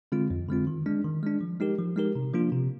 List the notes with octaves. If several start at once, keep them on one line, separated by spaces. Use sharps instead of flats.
D3 G#3 C4 F4
F2
D3 G#3 C4 F4
D#3
G#3 D4
D#3
G#3 D4
F3
G#3 D#4 G4 A#4
F3
G#3 D#4 G4 A#4
C3
F3 A#3 D4 F4
C3